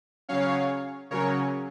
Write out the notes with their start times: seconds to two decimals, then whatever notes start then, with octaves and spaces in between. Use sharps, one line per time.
0.29 C#3 F#3 C#4 C#5 F5
1.11 C#3 F#3 C#4 A#4 C#5